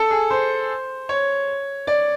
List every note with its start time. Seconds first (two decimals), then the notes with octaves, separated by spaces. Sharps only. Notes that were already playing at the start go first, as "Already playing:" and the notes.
Already playing: A4
0.10 G#4
0.30 C5
1.09 C#5
1.87 D5